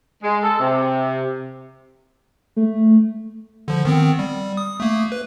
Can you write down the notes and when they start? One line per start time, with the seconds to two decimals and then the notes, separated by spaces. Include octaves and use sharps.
0.23 G#3
0.43 A4
0.59 C3
2.56 A3
3.68 D3 F3
3.85 D#3 B3 C4
4.19 G3
4.57 D#6
4.80 A3 A#3
5.12 B4